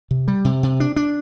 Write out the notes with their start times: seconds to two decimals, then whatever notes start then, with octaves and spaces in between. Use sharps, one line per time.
0.11 C3
0.28 G3
0.45 C3
0.63 C3
0.80 D4
0.96 D4